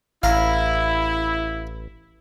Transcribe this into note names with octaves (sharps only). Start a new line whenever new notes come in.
A1 E4 F5 A#5